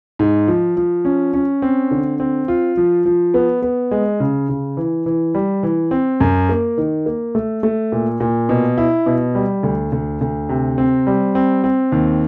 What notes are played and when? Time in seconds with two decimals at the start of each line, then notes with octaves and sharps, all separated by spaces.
0.19 G#2
0.48 F3
0.77 F3
1.05 C#4
1.34 C#4
1.62 C4
1.91 D3
2.20 C4
2.48 F4
2.77 F3
3.06 F3
3.34 B3
3.62 B3
3.91 G#3
4.20 C#3
4.49 C#3
4.77 E3
5.06 E3
5.35 G3
5.63 E3
5.91 C4
6.20 F#2
6.49 A#3
6.78 D#3
7.06 A#3
7.35 A3
7.63 A3
7.92 A#2
8.20 A#2
8.49 B2
8.78 E4
9.06 B2
9.35 G3
9.63 D2
9.92 D2
10.21 D2
10.49 C3
10.78 C4
11.07 G3
11.35 C4
11.64 C4
11.92 D#2